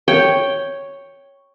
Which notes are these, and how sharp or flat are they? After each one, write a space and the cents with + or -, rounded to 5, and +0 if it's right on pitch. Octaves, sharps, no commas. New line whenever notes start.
C#5 +0 G5 +0